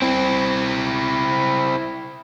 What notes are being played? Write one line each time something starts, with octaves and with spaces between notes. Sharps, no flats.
C4 E4